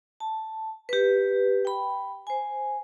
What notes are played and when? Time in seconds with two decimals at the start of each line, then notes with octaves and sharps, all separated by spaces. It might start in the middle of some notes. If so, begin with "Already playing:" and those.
0.20 A5
0.89 G4 B4
1.65 G5 B5
2.27 C5 G#5